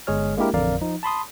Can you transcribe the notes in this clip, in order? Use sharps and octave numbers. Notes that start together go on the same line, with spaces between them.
G1 G#3 G#4 C#5 F6
G#3 A#3 D4 E4 G4 A#4
A1 F2 D3 A#4 D5 F5
F3 D#4
A5 B5 C6 D#6